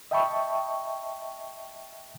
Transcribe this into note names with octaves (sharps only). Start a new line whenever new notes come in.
D#5 E5 G5 A5 B5 C#6